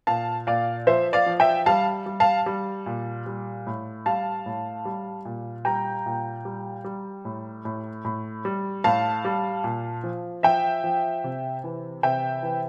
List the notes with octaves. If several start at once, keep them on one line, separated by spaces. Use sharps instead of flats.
A#2 F5 A5
A#2 D5 F5
F3 C5 E5
D5 F5
F3
E5 G5
G3 F5 A5
G3
F5 A5
G3
A#2
G3
A2
G3 F5 A5
A2
G3
A#2
G3 G5 A#5
A#2
G3
G3
A2
A2
A2
G3
A2 F5 A5
G3
A#2
F3
F3 E5 G5
F3
C3
E3
C3 E5 G5
E3